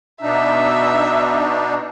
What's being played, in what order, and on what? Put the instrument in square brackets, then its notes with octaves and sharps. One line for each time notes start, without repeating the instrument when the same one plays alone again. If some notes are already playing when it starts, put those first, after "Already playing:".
[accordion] B2 D4 D#4 [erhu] E5